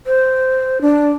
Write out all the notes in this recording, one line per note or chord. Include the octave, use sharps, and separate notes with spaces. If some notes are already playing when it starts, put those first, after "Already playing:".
C5
D4